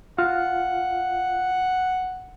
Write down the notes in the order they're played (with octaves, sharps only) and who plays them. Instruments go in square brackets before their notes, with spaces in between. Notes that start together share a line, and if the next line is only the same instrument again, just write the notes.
[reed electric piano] F4 F5 [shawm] F#5